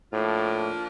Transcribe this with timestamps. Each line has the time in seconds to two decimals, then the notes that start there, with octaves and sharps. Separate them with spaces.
0.12 A2 F3 A#3 D4 F4